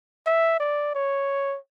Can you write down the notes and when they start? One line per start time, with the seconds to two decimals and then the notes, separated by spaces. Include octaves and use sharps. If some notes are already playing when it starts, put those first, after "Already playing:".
0.26 E5
0.60 D5
0.95 C#5